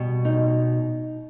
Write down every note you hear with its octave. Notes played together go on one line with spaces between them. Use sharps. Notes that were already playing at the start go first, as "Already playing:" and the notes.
Already playing: B2 G3
D#4